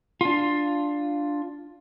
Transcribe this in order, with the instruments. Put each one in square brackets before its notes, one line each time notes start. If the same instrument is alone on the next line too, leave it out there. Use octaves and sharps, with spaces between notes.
[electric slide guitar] D4 F4